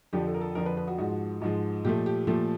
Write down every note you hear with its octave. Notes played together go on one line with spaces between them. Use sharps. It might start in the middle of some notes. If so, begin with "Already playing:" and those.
F2 D3 F3 G4
A4
A#4
A4
F2 D3 F3 A#4
B4
B4
F#4
G#2 F3 G#3 F#4
G#2 F3 G#3
A#2 F3 A3 G4
G4
A#2 F3 A3 G4